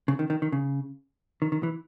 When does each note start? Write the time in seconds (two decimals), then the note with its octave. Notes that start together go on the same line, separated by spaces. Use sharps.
0.08 C#3
0.19 D#3
0.30 D#3
0.42 D#3
0.52 C#3
1.42 D#3
1.52 D#3
1.63 E3